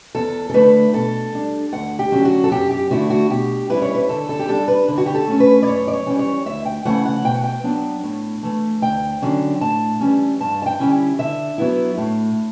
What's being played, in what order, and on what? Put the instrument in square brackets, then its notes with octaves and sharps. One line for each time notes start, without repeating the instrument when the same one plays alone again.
[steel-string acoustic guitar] E2 A4
A4
D3 A3 E4 B4
B2 A4
G3 D4
D2 F#5
G4
D3 F#3 C#4
F#4
A4
F#2 G4
G4
D3 A3 E4 F#4
F#4
B2 G4
G3 C#4 E4 B4
C#5
B4
D3 A4
A4
G4
G3 D4 A4
B4
D3
F#4
G4
A4
A3 C#4
B4
D5
F#2 C#5
D5
C#5
E3 G3 C#4
C#5
D2 E5
G5
C#3 E3 A3 E4 F#5
F#5
B2 G5
F#5
G5
F#3 B3 D4
A2
E3 A3
D2 G5
D3 F#3 C#4
A2 A5
E3 G3 C#4
G2 A5
A5
G5
D3 G3 C#4 E4
D3 E5
F#3 B3 E4
A2